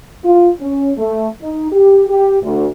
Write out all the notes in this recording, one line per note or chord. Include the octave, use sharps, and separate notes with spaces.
F4
C#4
A3
D#4
G4
G4
D2